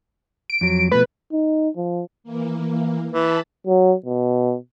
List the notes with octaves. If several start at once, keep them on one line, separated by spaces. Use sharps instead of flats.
D7
F2 F#3
B2 F3 A3 B4
D#4
F3
E3 A#3
E3 A5 B5
F#3
B2